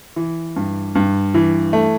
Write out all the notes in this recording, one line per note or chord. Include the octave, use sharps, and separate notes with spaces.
E3
G2
G2
E3
A3